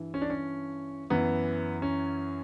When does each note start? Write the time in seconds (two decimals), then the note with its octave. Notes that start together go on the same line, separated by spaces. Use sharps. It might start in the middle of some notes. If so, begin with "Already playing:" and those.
Already playing: G2 E3
0.14 C#4
0.22 D4
0.30 C#4
1.10 F#2 E3 B3
1.82 C#4